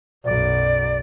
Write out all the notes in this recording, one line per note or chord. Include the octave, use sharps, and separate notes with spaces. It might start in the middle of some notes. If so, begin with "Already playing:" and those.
B1 F#2 D5